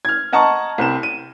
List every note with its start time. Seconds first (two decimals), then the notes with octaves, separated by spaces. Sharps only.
0.05 F6 G#6
0.33 D#5 F#5 A5 A#5 C#6
0.78 C2 C4 A#5 E7
1.03 D#7